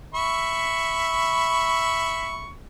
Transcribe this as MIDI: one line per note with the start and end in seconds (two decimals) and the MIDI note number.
0.15 2.50 76
0.15 2.50 83
0.15 2.50 85